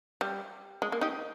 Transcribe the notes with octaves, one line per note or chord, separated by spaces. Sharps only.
G3
G#3
A#3
D#4 G4